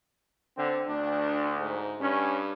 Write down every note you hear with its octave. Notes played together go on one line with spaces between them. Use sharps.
D3 C4
D2 D4
G#2
G2 C#4